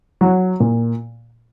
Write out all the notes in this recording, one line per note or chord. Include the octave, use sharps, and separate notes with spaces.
F#3
A#2